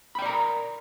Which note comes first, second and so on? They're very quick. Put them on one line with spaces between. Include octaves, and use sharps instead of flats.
B5 G5 D5 A#5 A#4